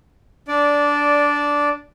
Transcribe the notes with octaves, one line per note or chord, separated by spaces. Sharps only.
D4 D5